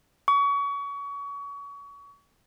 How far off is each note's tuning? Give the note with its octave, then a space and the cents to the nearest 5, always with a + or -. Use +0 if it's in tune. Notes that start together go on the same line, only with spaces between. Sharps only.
C#6 +30